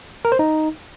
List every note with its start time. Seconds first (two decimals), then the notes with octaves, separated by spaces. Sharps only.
0.25 A#4
0.32 C5
0.39 D#4